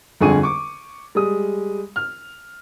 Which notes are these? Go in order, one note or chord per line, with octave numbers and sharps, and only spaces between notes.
G1 F2 D3 G#4 C#6 D#7
C#6 D6
G3 G#3 D#6
F6